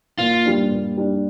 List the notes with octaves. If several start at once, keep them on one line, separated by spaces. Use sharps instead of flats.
A#2 F4
G3 D4
A#2
G3 D4